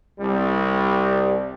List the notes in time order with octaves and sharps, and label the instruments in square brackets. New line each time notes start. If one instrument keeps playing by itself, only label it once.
[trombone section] C2 G3